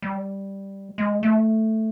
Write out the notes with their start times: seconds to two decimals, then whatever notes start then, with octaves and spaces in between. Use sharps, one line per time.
0.02 G3
0.98 G#3
1.23 A3